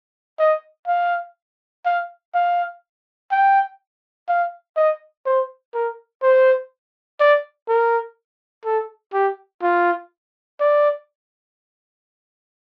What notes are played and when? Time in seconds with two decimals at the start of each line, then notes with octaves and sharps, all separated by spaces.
0.39 D#5
0.87 F5
1.85 F5
2.34 F5
3.31 G5
4.28 F5
4.76 D#5
5.26 C5
5.74 A#4
6.22 C5
7.20 D5
7.68 A#4
8.65 A4
9.13 G4
9.62 F4
10.60 D5